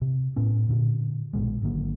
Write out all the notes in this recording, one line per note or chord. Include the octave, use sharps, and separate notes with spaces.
C3
A2 B3 C#4
A#2 D3
A#1 G#2 B2 G#3
G#1 D3 F#3 A#3